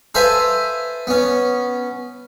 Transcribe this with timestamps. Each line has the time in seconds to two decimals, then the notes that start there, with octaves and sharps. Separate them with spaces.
0.15 A4 B4 C5 E5 F5 G#5
1.07 B3 C#4